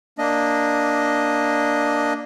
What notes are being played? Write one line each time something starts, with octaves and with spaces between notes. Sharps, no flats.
A#3 D4 D#5